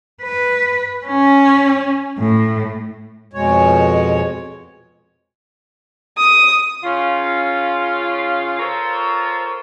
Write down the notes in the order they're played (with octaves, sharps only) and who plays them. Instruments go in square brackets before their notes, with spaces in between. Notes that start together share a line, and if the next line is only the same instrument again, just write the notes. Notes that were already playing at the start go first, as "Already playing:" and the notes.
[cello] B4
C#4
A2
[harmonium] F2 B2 G#3 C#5
[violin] D#6
[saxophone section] C#3 C#4 F4
F4 A4 A#4 C5 C#5